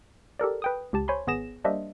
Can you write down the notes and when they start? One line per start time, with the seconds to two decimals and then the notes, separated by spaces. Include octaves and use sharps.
0.39 G4 A4 A#4 D5
0.62 B4 G5 D#6
0.93 C#2 G4 A5
1.08 C5 C#5 G#5 B5 C6
1.27 G#1 B3 G#4 A#6 E7
1.64 G3 A#3 D4 C5 D#5 E5